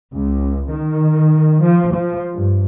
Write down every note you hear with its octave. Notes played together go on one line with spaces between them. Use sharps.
C#2
D#3
F3
F3
G2